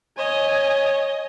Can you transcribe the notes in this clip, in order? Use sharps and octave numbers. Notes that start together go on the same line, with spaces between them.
C#5 D#5 G#5